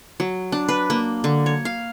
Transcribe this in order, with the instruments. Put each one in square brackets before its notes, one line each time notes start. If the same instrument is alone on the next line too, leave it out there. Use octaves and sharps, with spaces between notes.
[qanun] F#3
D4
B4
A#3
D3
C#5
F5